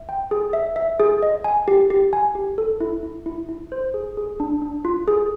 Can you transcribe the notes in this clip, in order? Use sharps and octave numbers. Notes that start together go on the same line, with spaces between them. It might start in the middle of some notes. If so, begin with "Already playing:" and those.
Already playing: E5
G5
G#4
E5
E5
G#4
D#5
G#5
G4
G4
G#5
G4
A4
E4
E4
E4
E4
C5
G#4
G#4
D4
D4
F4
G#4